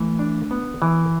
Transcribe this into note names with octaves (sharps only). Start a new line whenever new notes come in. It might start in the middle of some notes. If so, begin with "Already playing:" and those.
Already playing: E3 A3
D4
B3
E3